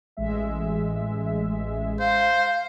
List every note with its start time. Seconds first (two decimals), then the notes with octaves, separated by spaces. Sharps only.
0.17 A1 G#3 E5
2.00 C5 F5